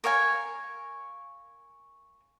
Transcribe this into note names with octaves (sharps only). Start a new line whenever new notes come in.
A#4 C#5 F5 G#5